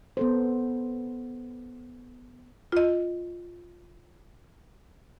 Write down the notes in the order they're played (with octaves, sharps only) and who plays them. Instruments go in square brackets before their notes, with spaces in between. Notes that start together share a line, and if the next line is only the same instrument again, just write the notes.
[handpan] B3 A4 C5
[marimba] F4 D#5